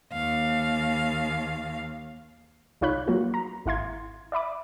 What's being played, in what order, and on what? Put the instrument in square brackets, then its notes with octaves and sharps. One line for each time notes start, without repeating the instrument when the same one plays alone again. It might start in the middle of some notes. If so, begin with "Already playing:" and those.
[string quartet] D#2 F5
[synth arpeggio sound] C2 D#4 F4 C#5 B5 F#6
F#3 A#3 F4 F#4
A#5
G#1 E4 F5 C6 G#6
D5 E5 B5 D6